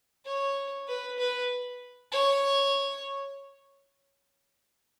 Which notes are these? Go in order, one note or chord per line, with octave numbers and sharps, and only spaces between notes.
C#5
B4
B4
C#5